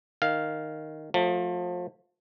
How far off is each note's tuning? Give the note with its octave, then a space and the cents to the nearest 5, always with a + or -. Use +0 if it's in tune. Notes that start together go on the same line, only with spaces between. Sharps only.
D#3 -5 F5 +0
F3 +30 A3 +15